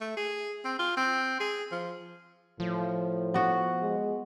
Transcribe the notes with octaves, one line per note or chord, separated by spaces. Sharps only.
A3
G#4
C4
F4
C4
G#4
F3
A2 F3
B3 F#4
G#3